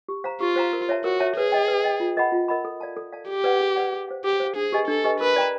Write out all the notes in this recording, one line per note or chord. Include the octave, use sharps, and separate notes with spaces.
G4
C5 F5 A#5
F4 G4
C5 F5 A#5
A#4
C#5 E5 A5
F#4 A#4
C#5 E5 A5
G#4 B4
D#5 G5
B4
D#5 G5
F4
A#4 D#5 F#5 B5
F4
A#4 D#5 F#5 B5
A4
D5 F5 A5
A4
D5 F5 A5
G4 G#4
B4 D5 F#5
G#4
B4 D5 F#5
G#4
C5 F5
G4 G#4
C5 F5
D4 G#4
G4 B4 D#5 G#5
D4 A4
G4 B4 D#5 G#5
A#4 B4
D5 G5 A#5